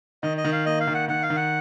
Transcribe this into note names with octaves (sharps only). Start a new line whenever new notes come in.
D#3 D#5
D#5
D#3
F5
A#3 D#5
F5
D#3
F#5
D#3 F#5
F5
D#3
F#5